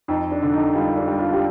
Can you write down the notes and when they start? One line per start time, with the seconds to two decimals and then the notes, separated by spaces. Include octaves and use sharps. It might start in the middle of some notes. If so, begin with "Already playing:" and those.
0.08 F2 D#4
0.31 D4
0.43 D3
0.53 D#4
0.75 G3 F4
0.97 D4
1.08 G3
1.19 F4
1.32 G4